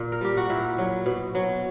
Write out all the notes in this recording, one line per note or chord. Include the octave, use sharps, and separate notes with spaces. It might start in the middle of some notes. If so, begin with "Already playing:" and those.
Already playing: A#2
A#4
G3 G4
F#4
A#2 E4
F#3
B2
F#3